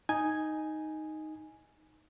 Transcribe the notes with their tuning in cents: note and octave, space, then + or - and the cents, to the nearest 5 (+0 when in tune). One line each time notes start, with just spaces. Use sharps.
D#4 +0 G#5 +0